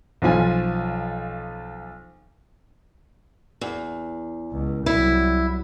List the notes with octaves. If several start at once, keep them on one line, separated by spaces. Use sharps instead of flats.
B1 F3 F4 G#5
E2
C#2
C2 F#3 E4